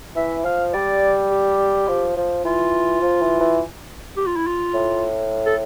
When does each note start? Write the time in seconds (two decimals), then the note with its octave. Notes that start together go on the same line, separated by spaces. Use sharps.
0.16 E3 E5
0.45 F3 F5
0.73 G3 D5
1.31 G4
1.88 F3
2.16 F3
2.45 E3 F4
3.02 F3
3.22 E3
3.40 E3
4.17 G4
4.27 F4
4.36 E4
4.47 F4
4.74 A2
5.46 A4